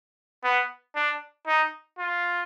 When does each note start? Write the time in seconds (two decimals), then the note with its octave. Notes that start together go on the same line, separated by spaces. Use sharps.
0.44 B3
0.95 D4
1.47 D#4
1.99 F4